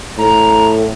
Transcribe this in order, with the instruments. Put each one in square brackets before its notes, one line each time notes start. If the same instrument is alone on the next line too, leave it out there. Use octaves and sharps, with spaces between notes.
[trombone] A2 [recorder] A#5